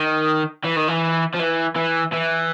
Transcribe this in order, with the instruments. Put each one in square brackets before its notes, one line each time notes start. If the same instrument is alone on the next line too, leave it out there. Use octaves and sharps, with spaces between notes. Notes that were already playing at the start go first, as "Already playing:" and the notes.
Already playing: [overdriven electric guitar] D#3
E3
D#3
E3
F3
E3
E3
E3